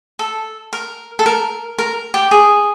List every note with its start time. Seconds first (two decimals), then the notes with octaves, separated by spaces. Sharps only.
0.19 A4
0.73 A#4
1.19 A4
1.26 A#4
1.79 A#4
2.14 G4
2.31 G#4